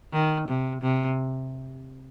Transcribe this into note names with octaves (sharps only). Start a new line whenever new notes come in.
D#3
C3
C3